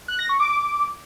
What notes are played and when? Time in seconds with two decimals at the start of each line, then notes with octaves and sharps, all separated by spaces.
0.08 F#6
0.19 A#6
0.29 C#6
0.40 D6